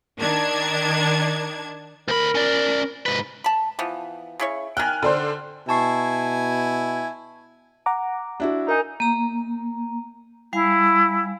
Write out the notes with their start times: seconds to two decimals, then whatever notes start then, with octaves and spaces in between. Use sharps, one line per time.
0.19 D#3 D4 A5 G#6
2.08 D2 A#4 B5
2.35 C#4 D5
3.06 G#2 B4
3.44 A5 B5
3.79 E3 F3 B3
4.40 C#3 E4 C#5
4.77 D#3 G5 G#5 F6 F#6
5.03 D3 D4 C5
5.69 B2 E4 G#5 A5 C#6 C7
7.86 F#5 A#5 D6
8.40 D4 E4 F#4
8.68 D#4 A#4 G#5
9.00 A#3 A#5
10.53 G3 E4 F5 G#5